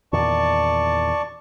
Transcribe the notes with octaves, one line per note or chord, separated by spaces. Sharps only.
E2 A#2 D#3 D5 A5 C#6